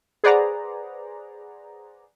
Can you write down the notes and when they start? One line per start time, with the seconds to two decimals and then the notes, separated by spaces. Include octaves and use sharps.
0.24 G#4 B4 C5 D5 F#5 A#5